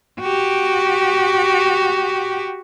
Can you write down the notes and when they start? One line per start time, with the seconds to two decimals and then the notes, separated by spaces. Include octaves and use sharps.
0.20 F#4 G4